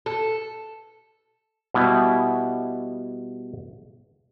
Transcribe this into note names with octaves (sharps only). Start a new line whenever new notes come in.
A4
B2 G3 B3 E4